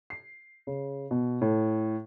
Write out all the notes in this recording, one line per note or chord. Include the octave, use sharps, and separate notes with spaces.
C7
C#3
B2
A2